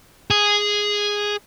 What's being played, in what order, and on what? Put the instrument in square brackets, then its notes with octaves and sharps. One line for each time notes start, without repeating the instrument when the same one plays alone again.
[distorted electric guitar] G#4